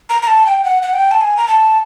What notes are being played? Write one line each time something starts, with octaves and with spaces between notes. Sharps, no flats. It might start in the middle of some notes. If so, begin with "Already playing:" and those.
A#5
A#5
A5
G5
F#5
F#5
G5
A5
G#5
A#5
A5